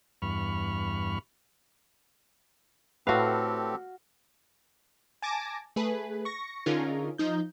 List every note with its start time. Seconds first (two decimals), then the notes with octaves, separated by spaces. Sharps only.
0.22 E2 G2 B5 C#6 F6
3.07 A2 C4 F#4 G4 A4 B4 F5
5.22 G#5 A5 D6 A#6
5.76 A3 G#4 B4
6.25 C#6 A#6
6.66 D3 C#4 D#4 F4 G#4 A#4
7.18 F3 D#4 G6